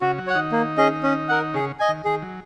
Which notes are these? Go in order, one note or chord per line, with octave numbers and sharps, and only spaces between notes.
C#3 C#4 F#4
F#3 F#4
C#5 F#5
D#3 D#4
A#3
C#4 G#4 D#5
C#4
A#4 F#5
C#3 C#4 G#4
D#5 G#5
D#3
D#3 G#4
F#3